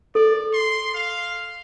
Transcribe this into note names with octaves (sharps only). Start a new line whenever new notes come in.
A4 D5
C6
F5